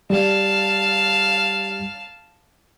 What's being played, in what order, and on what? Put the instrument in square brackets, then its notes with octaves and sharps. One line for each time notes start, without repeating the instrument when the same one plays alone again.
[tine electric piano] G3 [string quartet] F5 A5